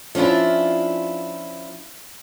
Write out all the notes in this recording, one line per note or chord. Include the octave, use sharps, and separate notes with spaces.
F3 C#4 D4 E4 F4